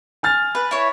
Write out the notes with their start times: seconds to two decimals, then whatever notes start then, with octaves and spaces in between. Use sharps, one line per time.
0.23 G#5 F6 A6
0.55 B4
0.71 E4 C#5